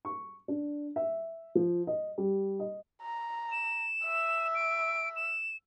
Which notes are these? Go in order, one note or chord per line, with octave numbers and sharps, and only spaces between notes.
C#6
D4
E5
F3
D#5
G3
D#5
A#5
E7
E5
D7
E7